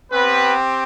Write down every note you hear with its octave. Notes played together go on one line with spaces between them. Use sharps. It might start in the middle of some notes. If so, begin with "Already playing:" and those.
B3 C4 G4 B4